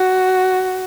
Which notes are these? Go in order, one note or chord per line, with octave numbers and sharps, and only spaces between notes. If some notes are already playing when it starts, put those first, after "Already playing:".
Already playing: F#4